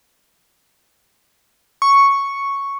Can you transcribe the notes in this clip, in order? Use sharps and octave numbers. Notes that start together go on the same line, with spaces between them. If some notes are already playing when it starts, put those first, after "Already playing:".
C#6